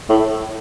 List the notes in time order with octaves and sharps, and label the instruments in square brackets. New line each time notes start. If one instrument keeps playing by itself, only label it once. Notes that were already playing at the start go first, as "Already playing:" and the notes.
[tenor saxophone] A2